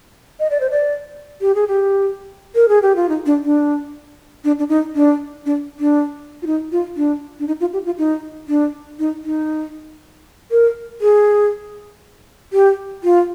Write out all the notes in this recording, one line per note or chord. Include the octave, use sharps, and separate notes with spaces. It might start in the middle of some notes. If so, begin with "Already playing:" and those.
D#5
D5
C5
D5
G4
G#4
G4
A#4
G#4
G4
F4
D#4
D4
D4
D4
D4
D#4
D4
D4
D4
F4
D#4
F4
D4
D4
D#4
F4
G4
F4
D#4
D4
D#4
D#4
A#4
G#4
G4
F4